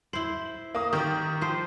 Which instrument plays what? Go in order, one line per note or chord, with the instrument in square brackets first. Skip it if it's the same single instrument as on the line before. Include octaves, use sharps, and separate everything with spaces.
[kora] E4 C5 [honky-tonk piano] F#7
[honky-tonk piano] A#3 D#6
[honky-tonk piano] D#3 [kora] G4
[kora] F3 C5